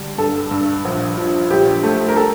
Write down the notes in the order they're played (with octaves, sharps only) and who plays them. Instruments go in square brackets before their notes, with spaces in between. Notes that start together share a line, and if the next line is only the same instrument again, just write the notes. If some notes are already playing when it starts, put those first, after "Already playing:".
Already playing: [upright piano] D3 G3
G2 A4
G2
A#1
F3
A#1 G4
A3
A#4
A4